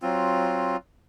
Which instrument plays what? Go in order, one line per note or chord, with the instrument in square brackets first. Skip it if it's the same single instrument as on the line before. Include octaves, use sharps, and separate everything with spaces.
[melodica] F#3 C4 F4